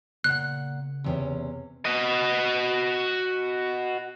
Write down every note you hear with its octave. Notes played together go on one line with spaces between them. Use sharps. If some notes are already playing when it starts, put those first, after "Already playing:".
A#2 C#3 F#5 F#6
E2 C3 C#4
F#4 D#5